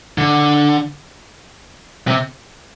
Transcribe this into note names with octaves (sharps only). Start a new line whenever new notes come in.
D3
C3